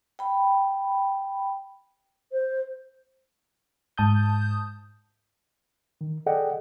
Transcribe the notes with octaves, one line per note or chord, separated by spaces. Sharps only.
G5 B5
C5
G#2 A5 D#6 G6
D#3
G#4 A4 D5 D#5 F#5 G5